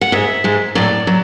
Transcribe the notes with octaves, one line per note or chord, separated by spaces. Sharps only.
F#5
G#2 G#3 E5
G#2 G#3
A2 F#3 D5
F#3